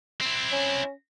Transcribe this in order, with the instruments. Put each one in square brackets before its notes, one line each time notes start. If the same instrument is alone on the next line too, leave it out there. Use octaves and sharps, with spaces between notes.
[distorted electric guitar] C4 E4
[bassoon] C#4